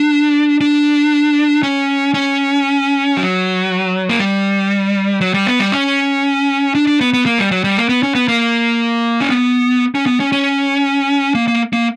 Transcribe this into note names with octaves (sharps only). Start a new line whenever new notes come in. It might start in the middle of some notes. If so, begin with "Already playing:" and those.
Already playing: D4
D4
C#4
C#4
F#3
A#3
G3
F#3
G3
B3
G3
C#4
D4
D4
B3
B3
A#3
G3
F#3
G3
A#3
B3
C#4
B3
A#3
C#4
B3
C#4
B3
C#4
C#4
A#3
A#3
A#3